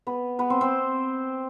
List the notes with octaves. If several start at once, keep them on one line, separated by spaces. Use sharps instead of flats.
B3 B4
B3 B4
C4 C5
C4 C5